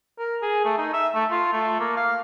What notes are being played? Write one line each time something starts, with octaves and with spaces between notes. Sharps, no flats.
A#4
G#4
A3
D#4
E5
A3
F4
A3
A#3
F5